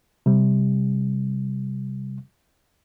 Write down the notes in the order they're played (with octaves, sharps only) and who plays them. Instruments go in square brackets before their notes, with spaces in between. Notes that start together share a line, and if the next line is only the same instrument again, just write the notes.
[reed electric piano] C3 G3